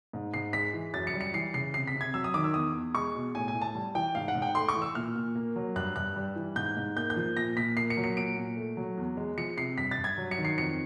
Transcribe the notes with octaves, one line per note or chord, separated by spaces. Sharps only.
G#2
G#2 C7
G#3 B6
E3
F#2 A6
C#7
G3
C#7
E3 C7
C#3 C7
C3 C7
B6
C3
G#6
F#3 E6
D#6
D#3 D6
E6
E2 D#6
E2
G#3 C#6
B2
A2 G#5
G#5
A2
A5
G3
E3 G5
G#2 F5
F#5
G#2
G5
A3 C6
C#6
E3
E6
A#2 F6
A#2
A#3
F#3
G2 F#6
G2 F#6
G3
E3
G#2 G6
G#2
A#3 G6
G6
F3
A#2 A#6
A#2 B6
A#3 C7
C#7
F#3
C#7
A#2 D7
A#2
A3
F#3
E2
G#3
F3 C#7
C3 C7
G2 B6
A6
G2
G#6
F#3
C#7
D#3
C7
F2 C#7